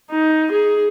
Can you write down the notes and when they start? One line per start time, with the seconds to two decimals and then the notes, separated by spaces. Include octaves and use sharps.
0.11 D#4
0.52 G#4